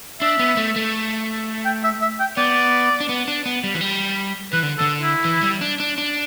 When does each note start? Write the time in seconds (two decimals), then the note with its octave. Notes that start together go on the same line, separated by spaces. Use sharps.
0.21 D4 E5
0.39 B3
0.57 A3
0.76 A3
1.65 G5
1.84 E5
2.02 E5
2.20 G5
2.37 B3 D5
3.00 D4
3.09 B3
3.28 D4
3.46 B3
3.64 G3
3.74 E3
3.81 G3
4.53 E3 B4
4.63 D3
4.78 A4
4.81 D3
5.01 E4
5.25 E3
5.43 G3
5.61 D4
5.80 D4
5.98 D4